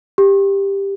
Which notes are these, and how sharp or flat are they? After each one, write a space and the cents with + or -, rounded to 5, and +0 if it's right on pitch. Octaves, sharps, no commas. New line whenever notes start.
G4 +10